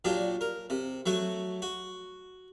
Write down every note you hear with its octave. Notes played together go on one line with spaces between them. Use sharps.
A#2 F#3 D4 G4
A#4
C3
F#3 A3 F#4
F#4